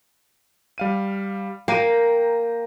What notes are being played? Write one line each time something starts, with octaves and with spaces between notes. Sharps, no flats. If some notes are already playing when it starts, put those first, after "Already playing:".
G3 F5 D#7
A#3 G5 A#5 D#7